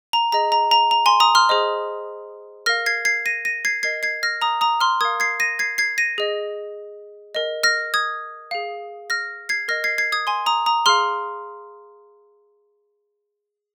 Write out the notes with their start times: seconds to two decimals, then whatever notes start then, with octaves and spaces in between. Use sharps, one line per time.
0.13 A#5
0.32 G#4 D#5 A#5
0.52 A#5
0.71 A#5
0.91 A#5
1.06 G#5 C6
1.20 A#5 D#6
1.35 C6 F6
1.49 G#4 C5 D#5
2.66 A#4 F5 F6 A#6
2.86 G#6 C7
3.05 G#6 C7
3.26 A#6 D#7
3.45 A#6 D#7
3.65 G#6 C7
3.83 A#4 D#5 G#6 C7
4.03 G#6 C7
4.23 F6 A#6
4.42 A#5 D#6
4.61 A#5 D#6
4.81 C6 F6
5.01 A#4 F5 D#6 G#6
5.20 G#6 C7
5.40 A#6 D#7
5.59 G#6 C7
5.78 G#6 C7
5.98 A#6 D#7
6.18 G#4 D#5
7.35 A#4 D#5
7.63 F6 A#6
7.94 D#6 G#6
8.51 G#4 F5
9.10 F6 A#6
9.49 G#6 C7
9.68 A#4 D#5 F6 A#6
9.84 G#6 C7
9.98 G#6 C7
10.12 D#6 G#6
10.27 G#5 C6
10.46 A#5 D#6
10.66 A#5 D#6
10.86 G#4 F5 C6 F6